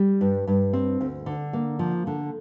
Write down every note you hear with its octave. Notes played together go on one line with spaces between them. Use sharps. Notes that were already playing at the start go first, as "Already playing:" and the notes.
Already playing: G3
G2
G2
C4
D2
D3
A#3
F3
D3